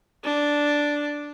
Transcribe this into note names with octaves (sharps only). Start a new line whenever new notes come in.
D4